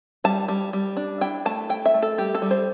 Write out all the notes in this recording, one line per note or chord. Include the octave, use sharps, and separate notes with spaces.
G3 A5
G3
G3
D4
E4 G5
A3 A5
E4 G5
E5
A3
A4
G3 G4
A4
G3
C5